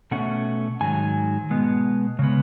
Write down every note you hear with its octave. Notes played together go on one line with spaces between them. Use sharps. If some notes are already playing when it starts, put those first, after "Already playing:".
B2 A3 C#4 F#5
G#2 D#3 F#3 G#5
B2 G#3 B3
C#3 G#3 B3